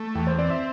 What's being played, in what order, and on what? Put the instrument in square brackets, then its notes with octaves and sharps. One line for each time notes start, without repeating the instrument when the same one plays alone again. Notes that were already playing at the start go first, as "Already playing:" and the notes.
Already playing: [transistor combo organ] A3
[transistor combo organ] E2 [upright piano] G5
[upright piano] C5
[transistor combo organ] C4 [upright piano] D5
[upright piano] E5